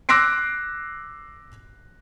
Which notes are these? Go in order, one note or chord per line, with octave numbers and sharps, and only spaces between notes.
D6 E6 F#6 A#6 C7 D7